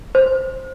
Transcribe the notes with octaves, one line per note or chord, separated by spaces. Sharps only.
C5